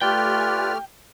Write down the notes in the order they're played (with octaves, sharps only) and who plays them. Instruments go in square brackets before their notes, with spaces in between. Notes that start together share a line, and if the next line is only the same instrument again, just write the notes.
[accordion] A3 G4 F6 [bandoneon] F4 B4 D5 [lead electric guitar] G5